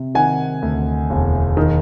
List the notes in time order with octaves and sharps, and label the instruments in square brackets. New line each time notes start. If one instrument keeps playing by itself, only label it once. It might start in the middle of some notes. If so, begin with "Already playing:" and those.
Already playing: [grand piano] C3
D#3 F#5 G#5
D2
E1
D#3